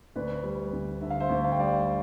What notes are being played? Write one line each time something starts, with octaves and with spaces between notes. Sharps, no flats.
D2 B4 D5
G3
D2
D3 E5
F5
C5 E5
D2
F5
G5
G3 D5 F5